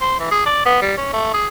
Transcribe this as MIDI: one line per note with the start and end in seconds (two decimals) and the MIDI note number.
0.01 0.19 72
0.20 0.28 52
0.31 0.43 68
0.46 0.63 74
0.65 0.78 59
0.82 0.95 55
0.97 1.10 61
1.13 1.32 57
1.34 1.47 68